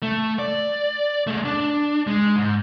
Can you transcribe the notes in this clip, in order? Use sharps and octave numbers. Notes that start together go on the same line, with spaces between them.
A3
D5
A3 G#4
D4
G#3
G#2